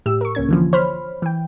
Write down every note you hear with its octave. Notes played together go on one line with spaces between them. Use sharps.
A2 G4 E6
A#4 C#6
C#2 A#3 C#4 G#6
D3 E3 F3
C5 C#5 B5 F6
E3 G5